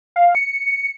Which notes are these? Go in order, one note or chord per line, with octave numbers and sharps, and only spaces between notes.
F5
C#7